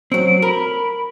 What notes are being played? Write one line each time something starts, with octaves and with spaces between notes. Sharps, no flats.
F#3 C4 D7
A#4 B5